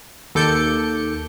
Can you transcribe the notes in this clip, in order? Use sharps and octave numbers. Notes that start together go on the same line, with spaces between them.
D#2 A4 D6 G6 C#7